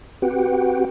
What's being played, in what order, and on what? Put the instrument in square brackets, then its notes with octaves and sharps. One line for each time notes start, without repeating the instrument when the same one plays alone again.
[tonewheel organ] C4 F#4 G4 B4 F#5 G5